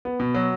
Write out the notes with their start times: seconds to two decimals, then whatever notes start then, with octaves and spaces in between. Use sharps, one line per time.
0.05 B3
0.20 B2
0.34 F#3